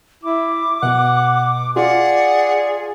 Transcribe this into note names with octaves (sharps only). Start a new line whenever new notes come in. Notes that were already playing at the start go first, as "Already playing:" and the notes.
E4 D6
B2 F#5
F4 G#4 D5 F#5